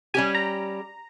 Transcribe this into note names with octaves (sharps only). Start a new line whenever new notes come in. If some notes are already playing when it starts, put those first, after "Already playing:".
G3 C#4 G4 G#5
A#5